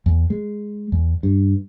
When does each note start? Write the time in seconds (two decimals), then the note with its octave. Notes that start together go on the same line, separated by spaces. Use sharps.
0.06 E2
0.30 G#3
0.92 E2
1.23 G2